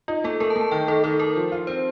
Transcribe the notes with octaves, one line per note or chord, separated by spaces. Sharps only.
D#4 F4
A3 A4
A3 A#4
A5
A3
A5
D#3 G5
D#3 A4
D#3 A4
A4 A#4
F3
F4
C4 C5